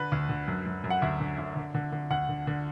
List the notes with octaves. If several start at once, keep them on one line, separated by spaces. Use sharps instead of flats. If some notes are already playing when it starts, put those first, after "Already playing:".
Already playing: D3 B4
D2
D3
F#2
F#2
F#2
F#5
D2 E5
D3
D2
D3
D3
D3
D2 F#5
D3
D3